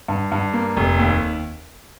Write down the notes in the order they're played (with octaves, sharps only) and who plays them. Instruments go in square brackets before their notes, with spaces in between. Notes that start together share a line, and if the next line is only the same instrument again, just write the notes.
[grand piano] G2
G2
A#3
F1
D#2